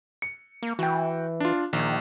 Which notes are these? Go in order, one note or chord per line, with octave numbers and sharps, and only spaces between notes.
C#7
A#3
E3 F#4 G5
D4 F4
A#1 D#3